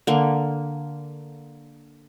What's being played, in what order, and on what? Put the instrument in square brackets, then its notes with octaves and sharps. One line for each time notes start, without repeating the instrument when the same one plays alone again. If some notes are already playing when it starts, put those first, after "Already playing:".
[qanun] D3 A#3